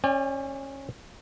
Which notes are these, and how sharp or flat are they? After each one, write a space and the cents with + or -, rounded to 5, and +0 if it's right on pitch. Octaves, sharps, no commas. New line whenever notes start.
C#4 -20 D5 +0 G5 +45